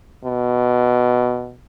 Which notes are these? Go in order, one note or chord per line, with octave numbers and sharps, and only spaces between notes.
B2